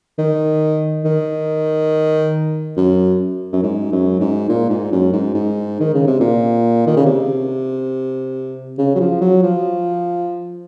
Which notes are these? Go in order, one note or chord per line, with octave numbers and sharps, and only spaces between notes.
D#3
D#3
F#2
F#2
G#2
F#2
G#2
A#2
G#2
F#2
G#2
G#2
D#3
C#3
C3
A#2
D#3
C#3
C3
C#3
F#3
F3
F#3
F3